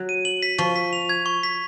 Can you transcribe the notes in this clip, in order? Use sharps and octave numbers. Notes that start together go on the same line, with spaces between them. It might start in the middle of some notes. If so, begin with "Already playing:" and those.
Already playing: F#3
D#7
F#7
B6
F3 C#6
B6
F7
G#6
C#6
B6